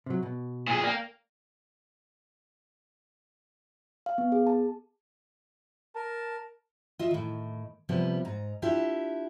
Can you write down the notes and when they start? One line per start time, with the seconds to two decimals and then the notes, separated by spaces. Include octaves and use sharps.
0.06 C3 F#3
0.23 B2
0.68 A#2 G#4
0.84 A#3 D5 G5
4.06 F5
4.18 B3
4.32 G#4
4.47 A5
5.96 A#4 A5
6.99 F4 D#5 E5
7.11 A2 D#3
7.89 C3 F3 G3 B3
8.25 G#2 A#5
8.62 D4 E4 F4 G4 E5